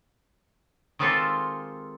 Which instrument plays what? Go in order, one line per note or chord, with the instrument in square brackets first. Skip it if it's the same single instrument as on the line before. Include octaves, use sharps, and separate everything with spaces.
[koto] D#3 G#3 C4 F4 G4 A4